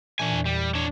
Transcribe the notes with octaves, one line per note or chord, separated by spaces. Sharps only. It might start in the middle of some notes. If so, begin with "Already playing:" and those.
A#2 E3 D4 G#5
E2
G3
D4 C#5